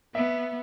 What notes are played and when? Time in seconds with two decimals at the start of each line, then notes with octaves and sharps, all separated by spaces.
0.15 B3 E5